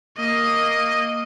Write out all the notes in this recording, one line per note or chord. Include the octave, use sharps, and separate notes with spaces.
A#3 D#5